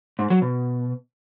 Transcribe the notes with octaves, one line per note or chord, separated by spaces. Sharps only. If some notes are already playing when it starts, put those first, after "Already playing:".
G#2
F#3
B2